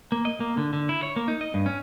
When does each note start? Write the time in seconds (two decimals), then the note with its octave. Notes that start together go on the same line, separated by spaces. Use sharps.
0.12 A#3
0.25 D#5
0.40 A#3
0.57 D3
0.73 D3
0.89 E4
1.03 C#5
1.16 A#3
1.28 D#4
1.41 D#5
1.54 G2
1.66 C#4